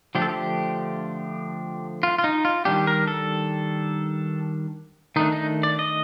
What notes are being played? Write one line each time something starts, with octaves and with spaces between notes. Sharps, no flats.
D3 F3 A3 D4 G4
A4
G4
F4
F4
D#4
F4
D#3 G3 D4 G4
A#4
A4
D#3 A3 D4 D#4
D#4
D5
D#5